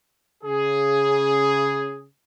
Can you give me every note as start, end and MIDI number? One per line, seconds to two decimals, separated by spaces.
0.43 2.05 49
0.43 2.05 68